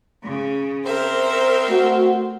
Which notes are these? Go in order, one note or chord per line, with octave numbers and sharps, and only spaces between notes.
C#3
C4 A#4 C5 E5
A3 F#4